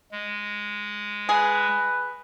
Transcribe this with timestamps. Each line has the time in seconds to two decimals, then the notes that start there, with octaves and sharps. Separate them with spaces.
0.11 G#3
1.29 G#4 B4